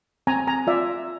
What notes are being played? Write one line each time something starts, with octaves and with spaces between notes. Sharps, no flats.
C4 G#5 A#5
G#5 A#5
F4 D5 E5